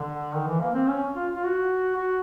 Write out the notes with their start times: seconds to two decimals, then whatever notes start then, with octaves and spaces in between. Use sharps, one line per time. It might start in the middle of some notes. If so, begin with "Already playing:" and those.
Already playing: D3
0.34 D#3
0.47 E3
0.61 A#3
0.74 C4
0.88 C#4
1.15 F4
1.36 F4
1.46 F#4
1.96 F#4